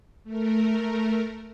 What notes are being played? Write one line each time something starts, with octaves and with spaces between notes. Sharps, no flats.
A3 A#4